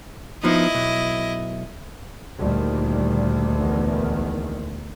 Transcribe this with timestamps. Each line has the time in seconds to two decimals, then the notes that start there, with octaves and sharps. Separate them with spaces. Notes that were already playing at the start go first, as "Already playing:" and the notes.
0.44 F3 B3 D#4 E4 D#5
0.75 B1
2.38 D2 A#2 D#3 G3
3.59 A#1 E2 D#3